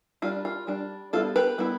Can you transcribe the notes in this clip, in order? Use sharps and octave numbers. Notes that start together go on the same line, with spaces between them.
G3 D4 F4
F4
G3 D4
G3 B3 E4 F4 A4
G4 B4
G3 B3 E4